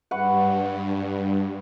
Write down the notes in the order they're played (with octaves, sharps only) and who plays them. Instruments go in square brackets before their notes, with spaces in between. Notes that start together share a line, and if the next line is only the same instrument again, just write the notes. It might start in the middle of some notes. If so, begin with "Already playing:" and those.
[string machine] G2 [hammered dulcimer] B4 F#5 C#6